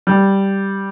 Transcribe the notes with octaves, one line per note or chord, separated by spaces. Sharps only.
G3